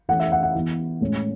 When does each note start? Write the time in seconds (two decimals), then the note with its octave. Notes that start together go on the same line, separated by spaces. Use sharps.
0.09 E3 A3 C#4 F#5
0.20 E5
0.32 F#5
0.43 F#5
0.55 E3 B3
1.01 A2 G#3 C#4